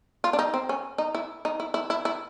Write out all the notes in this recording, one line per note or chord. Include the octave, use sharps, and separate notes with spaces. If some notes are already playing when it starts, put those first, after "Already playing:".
F4
D4
D#4
C4
C#4
D#4
E4
D#4
E4
E4
E4
E4